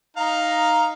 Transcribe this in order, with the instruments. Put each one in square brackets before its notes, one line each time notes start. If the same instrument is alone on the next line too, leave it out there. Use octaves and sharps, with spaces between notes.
[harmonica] D#4 F5 A#5